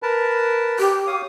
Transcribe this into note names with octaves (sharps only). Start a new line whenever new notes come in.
A#4 B4 A5
G4
C#5 F5 D#6